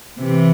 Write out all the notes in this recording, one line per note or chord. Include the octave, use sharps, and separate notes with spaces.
C3 E3